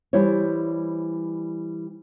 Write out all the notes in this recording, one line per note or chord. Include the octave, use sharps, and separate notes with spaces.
E3 G3 E4 C5 C#5